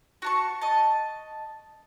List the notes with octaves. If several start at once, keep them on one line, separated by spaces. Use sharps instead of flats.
F#4 A5 C#6
D#5 A5